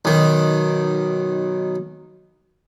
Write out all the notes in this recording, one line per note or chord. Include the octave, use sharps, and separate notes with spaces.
B1 D#3